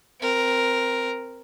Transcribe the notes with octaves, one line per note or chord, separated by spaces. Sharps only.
C4 A#4